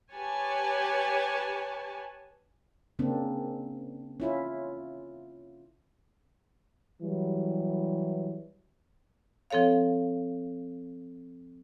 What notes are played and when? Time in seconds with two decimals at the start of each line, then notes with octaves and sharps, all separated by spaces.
0.11 G4 B4 C#5 G#5 A5
2.99 C#3 A#3 C4 D4
4.20 C#4 E4 F4
7.01 E3 F#3 G3
9.50 F3 C4 A4 C#5 F5